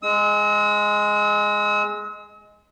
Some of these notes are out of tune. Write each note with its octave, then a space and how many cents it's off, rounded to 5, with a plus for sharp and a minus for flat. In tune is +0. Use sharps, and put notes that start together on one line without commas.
G#3 +0 E6 -45